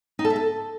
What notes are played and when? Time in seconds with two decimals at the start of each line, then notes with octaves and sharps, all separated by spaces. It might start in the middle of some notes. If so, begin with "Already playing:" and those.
0.19 D#4
0.25 A4
0.30 E5
0.36 A4